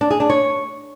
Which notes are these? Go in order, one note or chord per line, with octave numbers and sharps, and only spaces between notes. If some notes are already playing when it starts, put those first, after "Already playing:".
D4
G#4
D4
C#5